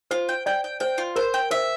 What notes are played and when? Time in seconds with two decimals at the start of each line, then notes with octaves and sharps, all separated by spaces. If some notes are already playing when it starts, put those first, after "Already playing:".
0.11 F4 C5
0.29 G5
0.46 D5 G5
0.64 G5
0.80 C5 G5
0.98 F4
1.16 A#4 C5
1.34 G5
1.51 C5 E5